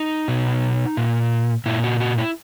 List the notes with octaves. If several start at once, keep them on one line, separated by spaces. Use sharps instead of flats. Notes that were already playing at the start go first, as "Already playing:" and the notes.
Already playing: D#4
B2
A#2
A#2 E4
F#4
F#4
E4